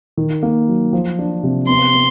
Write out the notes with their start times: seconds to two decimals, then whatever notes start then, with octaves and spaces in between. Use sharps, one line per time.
0.17 D#3
0.43 A#3
0.68 F#3
0.93 F3
1.19 D4
1.43 C3
1.68 B3 C6
1.94 B3